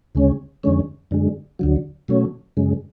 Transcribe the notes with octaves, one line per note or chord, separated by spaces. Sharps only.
D2 C#3 G#3 C#4
F2 D3 G#3 C#4
F#2 D3 G#3
D2 D3 F#3
B2 F#3 A3 C#4
F#2 C#3 G#3